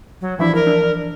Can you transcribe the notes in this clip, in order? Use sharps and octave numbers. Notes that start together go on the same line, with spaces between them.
F#3
E3 F3 D4 E4
A#4
D4